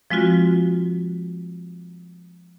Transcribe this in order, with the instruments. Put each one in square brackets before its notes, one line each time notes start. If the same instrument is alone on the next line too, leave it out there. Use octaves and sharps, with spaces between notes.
[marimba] F3 G#3 C4 F4 F#4